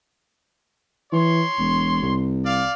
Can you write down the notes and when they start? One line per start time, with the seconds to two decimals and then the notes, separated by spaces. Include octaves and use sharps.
1.12 E3 C#5 C6
1.58 E1
2.02 C2
2.44 D5 F5